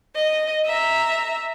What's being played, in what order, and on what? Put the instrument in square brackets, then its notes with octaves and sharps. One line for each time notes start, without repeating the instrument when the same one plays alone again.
[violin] D#5
E5 A#5